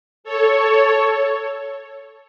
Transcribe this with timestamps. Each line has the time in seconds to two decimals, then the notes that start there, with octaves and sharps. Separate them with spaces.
0.24 A4 C#5